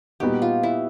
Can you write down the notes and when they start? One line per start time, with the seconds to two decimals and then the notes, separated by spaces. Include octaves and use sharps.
0.20 A#2 G3 B3 D#4 F#4 G4
0.42 F4
0.63 E4